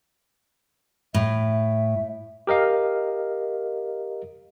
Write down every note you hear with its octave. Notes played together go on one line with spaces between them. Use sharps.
A2 E5
G4 A#4 D#5 F5